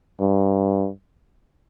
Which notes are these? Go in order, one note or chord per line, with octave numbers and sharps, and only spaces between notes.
G2